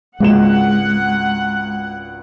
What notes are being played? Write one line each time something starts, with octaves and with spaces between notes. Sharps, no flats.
G#1 C#2 G#3 F#5 E7